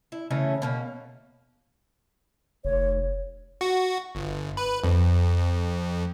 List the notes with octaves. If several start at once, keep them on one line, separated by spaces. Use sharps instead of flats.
E4
C#3 E3 A3 C#4
B2 A#3 C#4
F1 C#5
F#4
G1
B4
F2